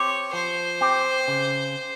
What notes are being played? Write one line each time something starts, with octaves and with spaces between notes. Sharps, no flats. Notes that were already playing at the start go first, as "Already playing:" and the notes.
Already playing: C4 G4 C#5
F3 C5
C4 G4
C#3